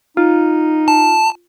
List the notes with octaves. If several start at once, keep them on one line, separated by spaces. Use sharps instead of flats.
D#4 F4
A5